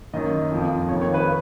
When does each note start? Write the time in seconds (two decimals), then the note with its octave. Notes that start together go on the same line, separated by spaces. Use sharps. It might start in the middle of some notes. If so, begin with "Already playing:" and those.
0.13 F#2 D#3 D#5
0.51 F2 F3
0.89 F2 D#3 C#5
1.02 C#5
1.14 B4